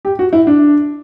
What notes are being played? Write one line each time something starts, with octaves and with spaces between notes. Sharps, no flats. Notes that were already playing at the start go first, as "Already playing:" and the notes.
G4
F#4
E4
D4